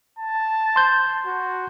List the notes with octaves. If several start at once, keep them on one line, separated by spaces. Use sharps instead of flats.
A5
C6 G6
F#4